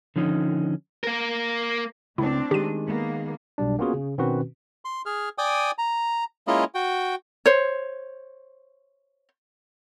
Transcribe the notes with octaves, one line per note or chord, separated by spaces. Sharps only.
D3 F3 C#4 D#4
A#3 A#4
C#2 A3 C4 D4 E4
D#3 G#3 G4 D#7
A#3 B3
B1 B2 G3 D4
A#3 B3 C#4 F4 F#4 G#4
C#3
B2 D#3 C4 C#4 F#4 B4
C6
G#4 F6
D5 G5 G#5 D6 D#6
A#5
G#3 A#3 C#4 E4 F4 D#5
F#4 G5
C5 C#5